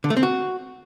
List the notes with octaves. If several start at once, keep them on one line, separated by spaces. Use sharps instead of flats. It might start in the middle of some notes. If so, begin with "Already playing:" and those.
D3
A3
C4
F#4